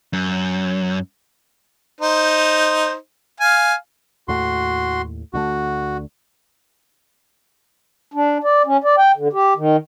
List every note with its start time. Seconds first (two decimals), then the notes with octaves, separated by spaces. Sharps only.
0.13 F#2
2.00 D#4 C5
3.40 F5 G#5
4.28 D#2 A2 A3 F#4 C6
5.33 D2 D3 A3 F#4
8.14 D4
8.44 D5
8.66 C#4
8.84 D5
8.98 G5
9.17 D3
9.33 G4
9.57 D#3